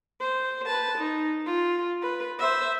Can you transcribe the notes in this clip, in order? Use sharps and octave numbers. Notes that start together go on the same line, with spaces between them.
C5
B4 A5
D#4
F4
B4
C5 E5